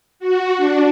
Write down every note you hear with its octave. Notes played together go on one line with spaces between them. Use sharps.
F#4
D4